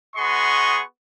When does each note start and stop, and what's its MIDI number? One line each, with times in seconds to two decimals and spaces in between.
0.16 0.81 59
0.16 0.81 66
0.16 0.81 68
0.16 0.81 75
0.16 0.81 84
0.16 0.81 85